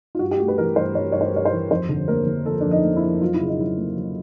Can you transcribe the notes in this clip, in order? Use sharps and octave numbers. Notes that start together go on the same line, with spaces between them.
F4
G2 F#4
G4
A3 F#4
B4
E3 A#4
G2 C5
G2 C#5
G2 C#5
C5
G2 C#5
C5
E3
F2 C5
D3
A#3 A#4
D3
F3 A4
F2 D4
D#4
A#3
E4
F2
F#3 F4
E4
C#3
D#4
F#3 E4
A#3
F#3